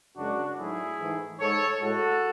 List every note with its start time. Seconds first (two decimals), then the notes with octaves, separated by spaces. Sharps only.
0.16 F#2 C#3 G#3 D4 F#4
0.56 G#2 F#3 A3 E4 G#4
0.98 G#2 E3 A3
1.38 G#2 G#3 A4 C#5
1.79 A2 G#3 F#4 A4